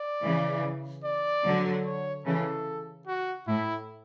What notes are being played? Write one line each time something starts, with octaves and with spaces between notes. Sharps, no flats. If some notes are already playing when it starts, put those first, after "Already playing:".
Already playing: D5
C#3 E3
D5
D3 F#3
C#5
C#3 E3 A4
F#4
A2 E4